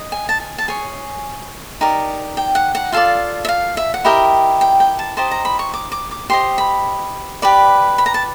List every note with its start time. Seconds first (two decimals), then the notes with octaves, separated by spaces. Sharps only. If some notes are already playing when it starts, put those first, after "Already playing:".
Already playing: D#5
0.12 G#5
0.29 A5
0.40 G#5
0.58 A5
0.68 G#4 C#5 G#5
1.81 D#4 G4 A#4 D5
2.37 G5
2.55 F#5
2.75 F#5
2.92 F4 A4 D5 F5
3.45 E5
3.49 F5
3.77 E5
3.94 F#5
4.05 E4 G4 A#4 D#5 G5
4.61 G5
4.80 G5
4.99 A5
5.17 D#4 G4 C5 D#5 A5
5.31 A#5
5.45 B5
5.59 C#6
5.73 D6
5.92 D6
6.11 D6
6.30 G4 C5 D#5 C6
6.58 B5
7.42 G4 B4 D5
7.98 B5
8.06 A#5
8.14 A5